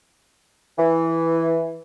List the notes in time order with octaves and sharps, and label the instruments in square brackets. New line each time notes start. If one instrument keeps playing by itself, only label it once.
[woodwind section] E3